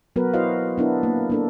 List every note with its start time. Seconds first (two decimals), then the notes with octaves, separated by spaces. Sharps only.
0.16 F#3 B3 F#4 A#4 B4
0.34 E4 F#4 C5 D#5 F5
0.78 B3 D4 E4 A#4
1.03 A#3
1.30 A#3 D4 A4